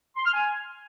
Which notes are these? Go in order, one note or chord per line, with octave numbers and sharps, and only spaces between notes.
C6
F6
G#5